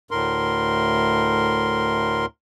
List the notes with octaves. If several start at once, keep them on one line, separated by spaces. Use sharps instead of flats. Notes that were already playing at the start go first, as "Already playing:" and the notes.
D2 A2 A#4 C6